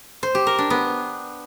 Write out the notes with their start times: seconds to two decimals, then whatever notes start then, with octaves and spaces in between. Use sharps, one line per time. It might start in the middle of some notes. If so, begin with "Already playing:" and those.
0.23 C5
0.35 G4
0.47 A#4
0.59 D4
0.70 B3